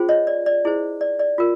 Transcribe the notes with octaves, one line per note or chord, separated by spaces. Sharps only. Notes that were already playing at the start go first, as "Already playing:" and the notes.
Already playing: C#4 F4 G#4 C5
C#5 D#5
D5
D5
E4 G#4 C5
D5
D5
F4 A#4